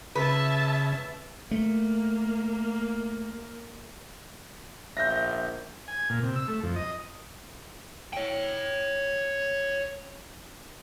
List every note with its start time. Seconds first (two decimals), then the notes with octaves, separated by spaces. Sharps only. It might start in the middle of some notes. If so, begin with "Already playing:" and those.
0.15 C#3 B4 E5 A5
1.51 A3 A#3
4.97 A#1 E5 G6 A#6
5.88 G#5
6.10 A#2
6.23 C3
6.36 E6
6.48 A3
6.63 F2
6.76 D#5
8.13 C#5 G5